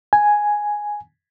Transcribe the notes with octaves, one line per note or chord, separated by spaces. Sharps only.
G#5